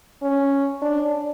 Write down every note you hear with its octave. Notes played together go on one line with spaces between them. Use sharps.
C#4
D4